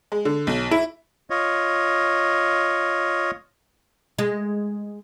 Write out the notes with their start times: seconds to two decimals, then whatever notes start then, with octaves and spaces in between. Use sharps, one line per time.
0.12 G#3
0.25 D3
0.47 B1
0.71 E4
1.30 F4 C#5 D#5
4.18 G#3